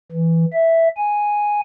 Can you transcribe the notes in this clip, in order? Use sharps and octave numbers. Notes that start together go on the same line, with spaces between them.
E3
E5
G#5